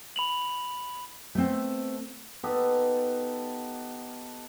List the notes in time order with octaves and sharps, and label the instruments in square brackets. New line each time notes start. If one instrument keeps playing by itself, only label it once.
[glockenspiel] B5 F7 F#7
[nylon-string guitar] A3 B3 C4
[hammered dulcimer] B3 D#4 G4 A4